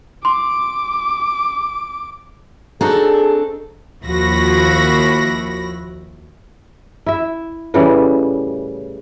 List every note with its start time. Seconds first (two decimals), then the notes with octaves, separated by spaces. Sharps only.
0.25 C6 D6
2.81 C4 D4 D#4 F#4 G#4 A4
4.04 D#2 F3 E4 F#4 B5 A#6
7.06 E4 E5
7.74 A2 C#3 E3 G3